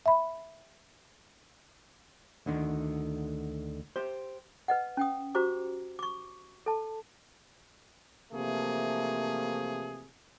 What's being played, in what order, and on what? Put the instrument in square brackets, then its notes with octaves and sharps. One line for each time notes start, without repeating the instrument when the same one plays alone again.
[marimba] E5 B5
[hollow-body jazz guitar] D2 D3 D#3
G4 C5
[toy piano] B4 D#5 F#5
C#4 G5 D#6
F#4 G4 C5 A#5 D6
C#6 D6
A4 A5
[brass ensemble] C3 E3 F3 A3 A#3 G#4